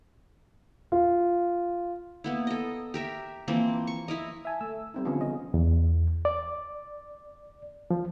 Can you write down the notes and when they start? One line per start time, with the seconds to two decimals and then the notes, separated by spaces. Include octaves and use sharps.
0.92 F4
2.24 A#3 B3 E4
2.47 A4 D#5
2.94 G4 A#4 E5
3.48 E3 F3 A#3 C4
3.87 C#6
4.08 E4 A#4 D#5
4.45 E5 G#5 A5
4.61 A3 E6
4.94 G3 C4 D#4
5.05 D3 F3 B3 C#4
5.21 C#3 D#5
5.54 E2
6.25 D5
7.91 F3